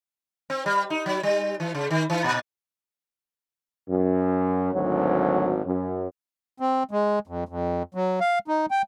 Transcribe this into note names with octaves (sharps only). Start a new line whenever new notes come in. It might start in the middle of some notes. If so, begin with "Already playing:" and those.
C4
G3
D#4
F#3
G3
E3
C#3
D#3
E3
A#2
F#2
G#1 D2 F#3
F#2
C4
G#3
F2
F2
F#3
F5
D#4
G5